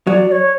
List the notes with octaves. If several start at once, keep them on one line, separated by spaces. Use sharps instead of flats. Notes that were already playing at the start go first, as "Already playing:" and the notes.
F#3 D5
D5
C#5